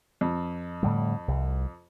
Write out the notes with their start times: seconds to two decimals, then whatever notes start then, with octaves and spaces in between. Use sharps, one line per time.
0.21 F2
0.83 A2 D3 G3
1.28 C2